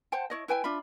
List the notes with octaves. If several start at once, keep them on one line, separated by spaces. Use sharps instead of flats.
C5 F#5 G5 A5
E4 C#5 D#5
E4 B4 G5 G#5
D4 F4 E5 B5